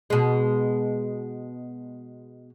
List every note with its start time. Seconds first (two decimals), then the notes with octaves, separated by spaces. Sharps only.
0.10 B2 G#3